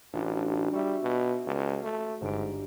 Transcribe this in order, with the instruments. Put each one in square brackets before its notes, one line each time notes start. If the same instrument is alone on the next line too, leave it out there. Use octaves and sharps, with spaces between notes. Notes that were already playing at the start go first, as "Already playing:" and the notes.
[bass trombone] A1 [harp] D4 F4 F#4
[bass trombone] G3 [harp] E5 C#6
[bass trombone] B2
C#2
A3
[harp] G1 D5 D7 [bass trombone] G#2